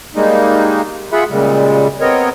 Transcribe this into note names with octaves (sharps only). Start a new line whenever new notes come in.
G3 G#3 A#3 D#4
F4 G#4 E5 F#5 B5
A#2 C#3 G3 G#3
B3 C4 A#4 C#5 D#5